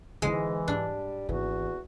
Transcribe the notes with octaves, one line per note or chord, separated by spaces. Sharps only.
G#2 D3 E3 G#3 E4
G#2 G3 D4
G#1 E2 E3 F#4